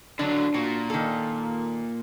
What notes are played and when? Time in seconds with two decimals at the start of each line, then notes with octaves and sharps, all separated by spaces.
0.19 D3 F#3 D4
0.54 A#2 F#4
0.90 D#3 A4